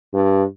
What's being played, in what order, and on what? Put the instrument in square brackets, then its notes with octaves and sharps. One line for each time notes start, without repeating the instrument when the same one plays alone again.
[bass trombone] G2